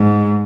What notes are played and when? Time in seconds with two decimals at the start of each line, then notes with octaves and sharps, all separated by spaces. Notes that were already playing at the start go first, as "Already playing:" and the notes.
Already playing: G#2